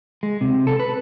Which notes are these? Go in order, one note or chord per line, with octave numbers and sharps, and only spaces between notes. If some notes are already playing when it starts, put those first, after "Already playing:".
G#3
C3
A4
B4